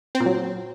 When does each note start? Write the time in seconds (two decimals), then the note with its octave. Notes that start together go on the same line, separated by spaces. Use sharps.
0.15 C4
0.20 A#2
0.26 F#3